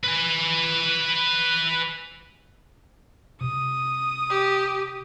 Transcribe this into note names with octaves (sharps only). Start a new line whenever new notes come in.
B4 G#5
C3 D#6
G4